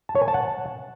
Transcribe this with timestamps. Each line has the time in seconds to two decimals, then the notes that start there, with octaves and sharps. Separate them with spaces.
0.09 A5
0.15 C#5
0.22 G#5
0.28 A5
0.34 F#5